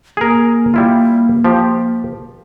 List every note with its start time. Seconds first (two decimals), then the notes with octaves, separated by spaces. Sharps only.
0.17 A#3 G#4 A#4
0.74 G3 E4 F4
1.45 F3 G4